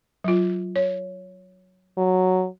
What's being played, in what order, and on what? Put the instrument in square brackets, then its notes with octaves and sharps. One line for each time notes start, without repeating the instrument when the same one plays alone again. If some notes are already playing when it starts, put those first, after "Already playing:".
[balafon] F#3 F4
C#5
[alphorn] F#3